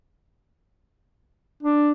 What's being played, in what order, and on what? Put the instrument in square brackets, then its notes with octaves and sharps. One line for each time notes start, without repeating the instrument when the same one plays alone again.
[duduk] D4